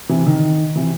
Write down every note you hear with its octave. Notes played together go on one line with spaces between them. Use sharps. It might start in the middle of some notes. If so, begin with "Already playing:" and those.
C3 E3
D#3
C3 E3